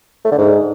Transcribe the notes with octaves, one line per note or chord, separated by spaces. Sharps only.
A3
D3
G#2